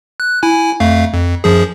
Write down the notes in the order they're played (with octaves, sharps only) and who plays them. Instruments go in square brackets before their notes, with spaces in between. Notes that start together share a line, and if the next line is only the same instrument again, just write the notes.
[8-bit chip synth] F#6
E4 G#5
F2 A3 F5
F2
F#2 F3 G#4